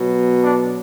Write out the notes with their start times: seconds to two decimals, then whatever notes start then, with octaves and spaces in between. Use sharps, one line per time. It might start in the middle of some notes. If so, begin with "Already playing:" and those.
Already playing: B2 F#3
0.43 D4